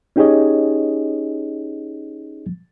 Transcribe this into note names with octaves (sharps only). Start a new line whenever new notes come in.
C#4 D#4 G4 G#4 C#5 D#5